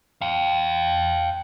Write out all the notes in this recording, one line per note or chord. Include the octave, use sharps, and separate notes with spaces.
F5 G5